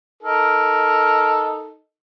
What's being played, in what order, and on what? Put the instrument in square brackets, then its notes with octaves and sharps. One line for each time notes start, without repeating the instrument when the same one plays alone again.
[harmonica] D#4 A4 A#4